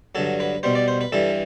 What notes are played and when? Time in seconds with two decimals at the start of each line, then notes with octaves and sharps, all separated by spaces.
0.15 G2 D3 F#3 A4
0.40 B4
0.63 B2 G3 C5
0.75 D5
0.88 C5
1.01 B4
1.12 G2 E3 G3 A4